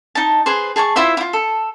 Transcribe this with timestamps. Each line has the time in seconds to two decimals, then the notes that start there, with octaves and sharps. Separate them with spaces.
0.15 D#4 A5
0.46 G#4 B4 C5
0.76 G#4 A5 C6 C#6
0.96 E4 F4 C5 E5
1.17 E4 F4
1.33 A4